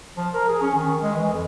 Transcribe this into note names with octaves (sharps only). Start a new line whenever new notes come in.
F3
A#4
G#4
C#4
D#3
G#3
E3
F2